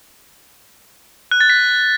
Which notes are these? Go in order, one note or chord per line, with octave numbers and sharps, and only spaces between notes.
F#6
A6
B6